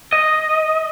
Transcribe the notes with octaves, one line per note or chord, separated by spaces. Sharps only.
D#5